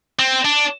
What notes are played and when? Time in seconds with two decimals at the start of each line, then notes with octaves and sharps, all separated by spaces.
0.19 C4
0.45 D4